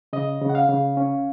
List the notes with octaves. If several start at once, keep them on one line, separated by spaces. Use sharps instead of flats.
C#3 D#5
C#3
F#5
F5
C#3
C#4